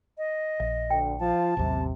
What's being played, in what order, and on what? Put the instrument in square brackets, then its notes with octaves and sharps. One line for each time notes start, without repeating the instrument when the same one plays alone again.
[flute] D#5
[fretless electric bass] A#1 [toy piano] E5
[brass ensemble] D2 [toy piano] G5
[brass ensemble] F3 F4 [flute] A5
[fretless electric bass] A1 D#2 F#3 [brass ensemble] C3